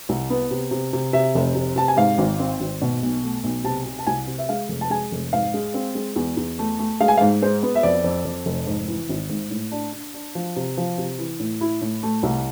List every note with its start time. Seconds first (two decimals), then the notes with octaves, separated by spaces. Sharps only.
0.09 C2
0.30 B3
0.51 C3
0.71 C3
0.93 C3
1.13 C3 E5
1.35 F1
1.55 C3
1.76 C3 A5
1.88 G#5
1.97 G#2 F5
2.18 G#1
2.39 C4
2.60 G#1
2.82 B2
3.03 B1
3.23 A3
3.44 B1
3.64 C3 A5
3.85 C3
3.99 A5
4.07 C2 G#5
4.27 C3
4.38 E5
4.49 G#3 F5
4.69 F1
4.81 A5
4.90 G#3 G#5
5.12 F1
5.32 G#2 F5
5.54 G#3
5.74 C4
5.95 G#3
6.16 E2
6.37 E2
6.59 A3
6.79 A3
7.01 G#3 F5
7.08 G#5
7.18 F5
7.21 G#2
7.42 G#3 C5
7.63 B3
7.75 E5
7.83 F2 D5
8.04 F2
8.25 F2
8.46 F1
8.67 G#2
8.88 E3
9.09 G#1
9.30 G#2
9.51 A2
9.72 D4
9.93 D4
10.14 D4
10.35 F3
10.56 C3
10.77 F3
10.98 C3
11.18 E3
11.40 A2
11.61 E4
11.81 A2
12.03 A3
12.23 C2